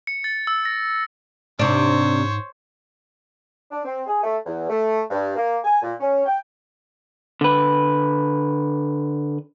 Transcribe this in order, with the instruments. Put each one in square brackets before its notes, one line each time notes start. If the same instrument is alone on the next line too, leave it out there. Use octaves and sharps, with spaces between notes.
[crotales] C#7
A6
E6
A#6
[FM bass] G#2 [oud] C3 D4 [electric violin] C5 C#5
[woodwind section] D4
C4
G#4
A3
E2
A3
G2
A#3
G#5
A#2
C#4
G5
[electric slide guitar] D3 B4